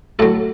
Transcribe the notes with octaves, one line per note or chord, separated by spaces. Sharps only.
A2 F#3 A4